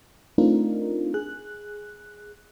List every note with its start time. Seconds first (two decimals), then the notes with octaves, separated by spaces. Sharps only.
0.38 A3 C4 D4 D#4 F4 A#4
1.14 G#4 F#6